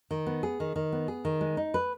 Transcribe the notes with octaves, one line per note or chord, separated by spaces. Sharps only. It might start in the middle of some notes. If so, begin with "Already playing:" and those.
D#3
B3
G#4
D#3
D#3
B3
G#4
D#3
G#3
D#4
B4